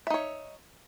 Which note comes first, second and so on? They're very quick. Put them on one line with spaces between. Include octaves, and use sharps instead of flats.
E5 D#4 C#5